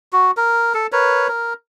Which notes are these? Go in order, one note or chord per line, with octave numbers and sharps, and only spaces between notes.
F#4
A#4
A4
A#4 B4 C#5
A#4